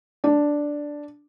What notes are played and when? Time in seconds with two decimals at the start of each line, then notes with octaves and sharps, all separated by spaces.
0.24 D4